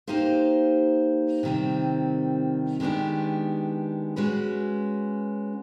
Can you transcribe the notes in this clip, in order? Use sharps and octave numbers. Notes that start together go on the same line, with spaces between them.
A#3 D#4 G4 C5 F5
C3 D#3 G3 C4
D#3 G#3 B3 D4 G4
G#3 C#4 F#4 B4